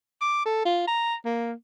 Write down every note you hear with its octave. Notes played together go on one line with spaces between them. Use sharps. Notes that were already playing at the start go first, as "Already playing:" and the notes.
D6
A4
F4
A#5
A#3